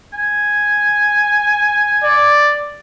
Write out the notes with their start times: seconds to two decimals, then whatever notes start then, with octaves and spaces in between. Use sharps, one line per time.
0.13 G#5
2.04 D5